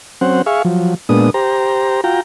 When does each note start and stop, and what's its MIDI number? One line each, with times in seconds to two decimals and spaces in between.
0.21 0.42 54
0.21 0.42 60
0.21 0.42 61
0.21 0.42 72
0.21 0.42 78
0.46 0.62 68
0.46 0.62 76
0.46 0.62 77
0.46 0.62 85
0.65 0.94 53
0.65 0.94 54
1.09 1.30 46
1.09 1.30 56
1.09 1.30 59
1.09 1.30 62
1.09 1.30 87
1.34 2.01 67
1.34 2.01 72
1.34 2.01 82
2.04 2.21 65
2.04 2.21 66
2.04 2.21 79
2.04 2.21 82